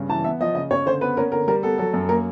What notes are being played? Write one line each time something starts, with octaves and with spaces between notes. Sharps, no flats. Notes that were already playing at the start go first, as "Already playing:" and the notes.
Already playing: G2 C#3
E3 A5
B3 E5
F3 D#5
C#3 D#5
C#3 C#5
D3 C5
B3 B4
C#4 A#4
D3 A#4
G3 A#4
B3 A4
F#3 A4
F#2
A#3 A#4